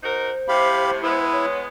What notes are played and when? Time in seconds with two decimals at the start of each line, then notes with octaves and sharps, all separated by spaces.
0.03 D#4 F#4 A#4 C5
0.48 A2 C3 G4 F5 B5
1.03 G#3 B3 E4
1.32 C#5